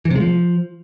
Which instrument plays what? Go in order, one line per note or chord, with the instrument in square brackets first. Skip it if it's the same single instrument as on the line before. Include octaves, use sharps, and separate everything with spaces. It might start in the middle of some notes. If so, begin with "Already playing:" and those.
[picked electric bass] E3
C3
G#3
F3